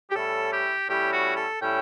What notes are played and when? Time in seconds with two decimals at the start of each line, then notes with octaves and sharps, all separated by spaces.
0.11 G4
0.16 A2 G3 C#4 E4 A4
0.52 G4
0.89 A2 G3 C#4 E4 G4
1.13 F#4
1.37 A4
1.61 A2 G3 C#4 E4 G5